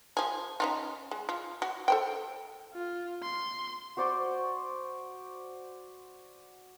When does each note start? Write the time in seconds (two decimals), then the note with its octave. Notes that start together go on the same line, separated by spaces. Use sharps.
0.17 F3 G#4
0.60 C#4 D#4 F4
1.11 G#3
1.29 F4
1.62 F#4
1.88 A4 C5 G5
2.74 F4
3.23 C6
3.97 F#4 C5 D5 C#6